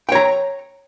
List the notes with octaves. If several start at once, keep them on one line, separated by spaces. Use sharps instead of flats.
C#5 G5 A#5